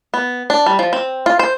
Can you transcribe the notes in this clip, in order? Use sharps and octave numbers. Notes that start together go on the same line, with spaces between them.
B3
D4
G3
F3
C4
F4
C5